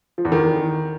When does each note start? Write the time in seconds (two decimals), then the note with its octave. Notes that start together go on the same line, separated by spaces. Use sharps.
0.18 F3
0.25 E2
0.32 D#3